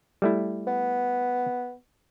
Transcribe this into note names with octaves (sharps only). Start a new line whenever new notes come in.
G3 A3 E4
B3